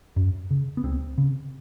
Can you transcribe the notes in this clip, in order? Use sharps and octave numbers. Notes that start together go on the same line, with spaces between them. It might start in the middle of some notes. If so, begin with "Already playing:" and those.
F#2
C#3
B3
C#2 C4
C#3